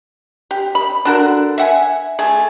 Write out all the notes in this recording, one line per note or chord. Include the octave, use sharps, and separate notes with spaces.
G4
B5
D3 F#4 A#4
E5 F#5 G#5
A3 G#4